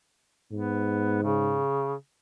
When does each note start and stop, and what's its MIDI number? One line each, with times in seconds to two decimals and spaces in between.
0.52 1.64 44
0.52 1.18 59
1.23 1.94 49